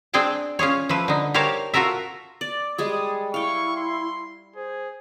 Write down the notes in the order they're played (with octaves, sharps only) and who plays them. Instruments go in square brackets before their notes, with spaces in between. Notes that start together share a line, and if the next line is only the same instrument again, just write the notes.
[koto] C4 D4 G#4 G5 A5
C#4 F4 G#4 C#5
F3 A3 B4
D3 D#4
G4 A#4 C5 C#5 F5 A5
F4 F#4 A4 A#4 E5
[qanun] D5
[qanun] G3 G#3 G#4 [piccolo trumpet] D#6
[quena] E4 [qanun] F5 G5 [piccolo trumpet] C#6
[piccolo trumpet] C6
[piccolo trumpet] G#4 [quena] C5